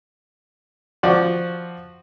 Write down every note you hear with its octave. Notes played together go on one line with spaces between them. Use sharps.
F3 F#4 D5